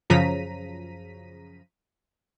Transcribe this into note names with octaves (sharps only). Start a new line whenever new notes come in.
F#2 C#3 F3 A#5 B6 D#7